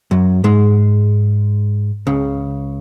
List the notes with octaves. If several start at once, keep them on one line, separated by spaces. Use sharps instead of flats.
F#2 F#3
G#2 G#3
C#2 C#3